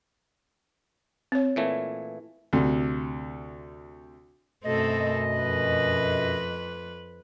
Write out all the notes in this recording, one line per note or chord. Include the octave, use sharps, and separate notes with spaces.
C4 C#5
A#2 E3 A3
D2 C3
F#2 B2 A3 C4 A4 D#5
F2 B4